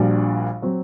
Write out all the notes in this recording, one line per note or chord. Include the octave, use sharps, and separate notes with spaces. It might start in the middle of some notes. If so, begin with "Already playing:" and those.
Already playing: A#1 A#2 G3 D4 F#4
F#3 C4 F#4